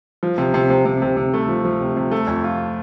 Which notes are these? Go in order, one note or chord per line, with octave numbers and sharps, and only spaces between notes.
F3
C3
C3
C3
C3
C3
C3
A3
F3
F3
C3
C3
A3
F2
F4